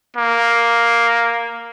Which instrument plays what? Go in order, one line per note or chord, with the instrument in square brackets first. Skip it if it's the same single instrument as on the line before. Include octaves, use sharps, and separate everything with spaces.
[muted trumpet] A#3